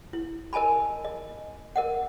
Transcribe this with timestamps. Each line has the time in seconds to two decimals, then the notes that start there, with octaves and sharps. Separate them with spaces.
0.13 E4
0.53 A#4 D#5 G#5 A5 B5
1.05 D#5
1.76 A#4 D#5 F#5